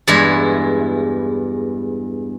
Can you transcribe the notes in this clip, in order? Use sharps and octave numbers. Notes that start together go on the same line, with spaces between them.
E2 G2 G#3 E4